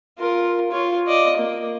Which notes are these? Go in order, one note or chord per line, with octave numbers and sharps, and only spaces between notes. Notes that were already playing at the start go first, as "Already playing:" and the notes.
F4 A#4
F4 C#5
D5 D#5
A#3